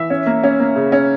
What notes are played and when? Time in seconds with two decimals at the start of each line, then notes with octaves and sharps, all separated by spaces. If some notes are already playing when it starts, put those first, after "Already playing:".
Already playing: E3 E5
0.10 C#4
0.26 A#3
0.43 C#4
0.60 A#3
0.75 C#3
0.92 C#4